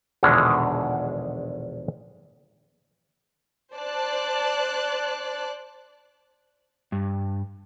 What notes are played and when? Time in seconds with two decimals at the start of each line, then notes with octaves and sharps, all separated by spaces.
0.23 A#1 E2 B2 D3 D#3 G#3
3.75 C5 D5 A5 F#6
6.92 G2